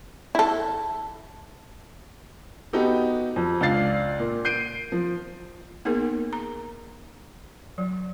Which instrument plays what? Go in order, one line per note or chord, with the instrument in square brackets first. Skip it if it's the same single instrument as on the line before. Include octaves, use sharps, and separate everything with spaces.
[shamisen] E4 A4
[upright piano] B3 D#4 F#4 G4 A4
F2
C#2 D4 D5 F5 A6 C7
A#2
G6 C7 D7 D#7
F3
[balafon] A#3 B3 D#4 G#4 A#4
A#5
F#3